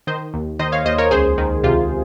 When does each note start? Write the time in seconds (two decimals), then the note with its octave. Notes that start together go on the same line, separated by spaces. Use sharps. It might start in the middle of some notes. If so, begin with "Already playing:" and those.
0.07 D#3 C5 D#5
0.34 D#2
0.59 D#3 C5 D#5
0.72 C#5 F5
0.85 D#2 C5 D#5
0.98 A#4 C#5
1.11 C#2 G#4 C5
1.38 D#3
1.64 C3 F4